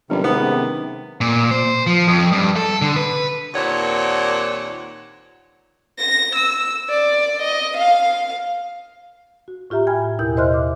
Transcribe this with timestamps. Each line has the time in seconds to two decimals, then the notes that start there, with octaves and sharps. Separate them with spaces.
0.10 G1 C3 D#3 F#3 C#4
0.24 G#2 B3 C#4
1.21 A#2
1.51 C5
1.87 F3
2.07 F2
2.32 G2
2.56 A4
2.82 D3
2.96 B4
3.54 D#2 A#2 C4 D4 C#5 F#5
5.99 A#6
6.36 E6
6.90 D5
7.42 D#5
7.78 F5
9.48 F#4
9.70 A2 F4 G4 E5 A#5
9.87 G5 G#5 B5 F6 G#6
10.19 D#2 B2 E4 A#4 G6
10.37 C5 D#5 E5 C6 F6 F#6
10.54 D6